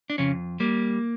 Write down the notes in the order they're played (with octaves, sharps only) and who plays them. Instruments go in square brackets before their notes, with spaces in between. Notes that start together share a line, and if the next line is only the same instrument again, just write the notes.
[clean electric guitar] D4
F2 C#3 C#4
G3 A#3